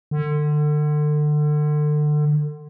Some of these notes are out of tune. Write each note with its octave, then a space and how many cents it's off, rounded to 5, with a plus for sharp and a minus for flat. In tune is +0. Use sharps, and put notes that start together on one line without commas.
D3 +30